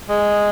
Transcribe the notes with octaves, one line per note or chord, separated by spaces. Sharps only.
G#3